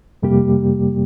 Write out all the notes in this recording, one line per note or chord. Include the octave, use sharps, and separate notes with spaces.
F2 C3 G3 A#3 G4